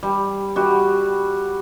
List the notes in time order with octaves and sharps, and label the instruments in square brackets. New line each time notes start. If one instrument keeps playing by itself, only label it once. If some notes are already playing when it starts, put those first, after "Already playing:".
[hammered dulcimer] G3
G3 F#4